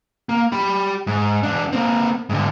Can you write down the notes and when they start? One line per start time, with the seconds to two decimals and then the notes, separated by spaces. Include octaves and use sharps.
0.29 A#3
0.52 G4 B5
1.07 G#2
1.43 E2 D4
1.73 A#3 C4
2.29 G#2 D3